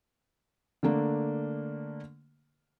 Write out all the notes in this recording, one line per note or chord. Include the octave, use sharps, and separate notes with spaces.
D3 A3 A#3 D4